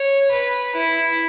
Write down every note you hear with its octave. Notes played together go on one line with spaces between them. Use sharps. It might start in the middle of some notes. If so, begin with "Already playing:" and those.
Already playing: C#5
B4
E4